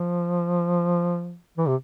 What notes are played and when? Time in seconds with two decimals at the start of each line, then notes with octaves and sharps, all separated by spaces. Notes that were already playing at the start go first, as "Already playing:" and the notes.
Already playing: F3
1.58 E3
1.68 C3